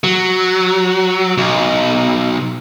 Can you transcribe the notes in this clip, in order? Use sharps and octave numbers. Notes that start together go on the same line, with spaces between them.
F#3
B1